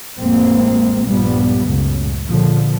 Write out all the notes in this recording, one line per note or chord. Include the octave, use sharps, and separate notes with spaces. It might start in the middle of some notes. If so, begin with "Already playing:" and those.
A1 F2 G#3 A#3 C4
A#1 G2 F3 G3 B3
C#2 F#2 A2 C#3
A#2 D3 F3